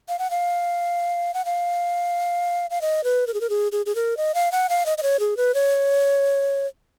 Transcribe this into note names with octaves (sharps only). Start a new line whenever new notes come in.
F5
F#5
F5
F#5
F5
F5
D#5
B4
A#4
G#4
A#4
G#4
G#4
G#4
A#4
D#5
F5
F#5
F5
D#5
D#5
C#5
G#4
B4
C#5